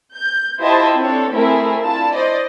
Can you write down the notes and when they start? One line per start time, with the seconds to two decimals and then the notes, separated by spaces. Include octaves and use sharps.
0.15 G6
0.59 E4 F4 G4 C5 D#5 A5
0.98 C4 D4 A4 C#5
1.32 A3 C4 E4 G#4 A#4
1.83 D4 E4 F4 A5
2.12 C5 D5 D#5